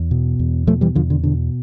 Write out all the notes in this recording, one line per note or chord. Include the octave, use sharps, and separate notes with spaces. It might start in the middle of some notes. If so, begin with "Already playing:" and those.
Already playing: E2
B2
E2
B2 F3 A3
E3 G3
E2 D3 F3
D3
B2 D3